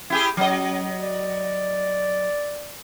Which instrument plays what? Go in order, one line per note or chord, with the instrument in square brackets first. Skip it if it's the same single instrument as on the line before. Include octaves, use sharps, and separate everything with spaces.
[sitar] E4 G4 G#4
[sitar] F#3 D#5 [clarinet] C#4
[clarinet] D5